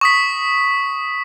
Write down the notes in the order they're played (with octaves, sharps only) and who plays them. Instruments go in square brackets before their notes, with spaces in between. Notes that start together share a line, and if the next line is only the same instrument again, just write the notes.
[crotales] C#6 D#6 B6